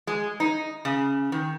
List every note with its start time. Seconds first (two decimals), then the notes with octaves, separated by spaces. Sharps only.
0.07 G#3
0.40 D#4
0.85 C#3
1.32 D#3